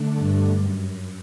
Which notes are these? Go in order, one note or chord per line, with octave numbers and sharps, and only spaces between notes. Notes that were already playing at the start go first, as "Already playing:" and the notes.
Already playing: D3 A3 D4
G2
F#2